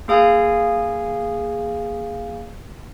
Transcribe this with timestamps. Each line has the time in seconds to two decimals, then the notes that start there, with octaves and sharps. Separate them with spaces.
0.08 A#3 G#4 F5 G#5